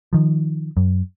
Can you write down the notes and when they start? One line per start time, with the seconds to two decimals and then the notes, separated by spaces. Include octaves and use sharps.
0.13 D#3 F3
0.77 F#2